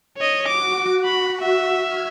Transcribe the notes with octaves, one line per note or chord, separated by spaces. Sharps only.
C#5 D#5
F#4 D6
B5
E5
F6 G#6